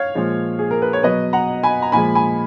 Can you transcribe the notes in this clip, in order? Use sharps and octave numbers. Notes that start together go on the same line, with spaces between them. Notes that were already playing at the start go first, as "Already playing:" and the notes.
Already playing: C#5 F5
A#2 F3 G#3
G#4
A#4
B4
C#5
B2 F#3 B4 D#5
F#5 A#5
G#5 B5
A#5
A#2 F3 G#3 G#5 B5
G#5 B5